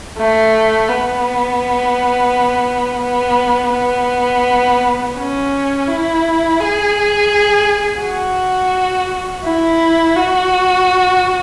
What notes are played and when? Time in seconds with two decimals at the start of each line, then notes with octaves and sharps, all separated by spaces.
0.18 A3
0.89 B3
3.03 B3
3.74 B3
5.17 C#4
5.88 E4
6.59 G#4
8.01 F#4
9.44 E4
10.16 F#4